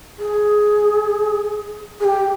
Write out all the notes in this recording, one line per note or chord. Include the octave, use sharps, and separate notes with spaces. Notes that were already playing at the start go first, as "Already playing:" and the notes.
G#4
G#4
G4